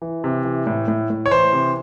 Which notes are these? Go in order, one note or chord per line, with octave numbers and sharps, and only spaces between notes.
E3
C3
E3
A2
A2
A2
C#5
E3 C5
C3